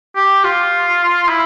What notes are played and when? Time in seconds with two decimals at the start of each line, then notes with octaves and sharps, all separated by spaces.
0.16 G4
0.44 F4
1.29 E4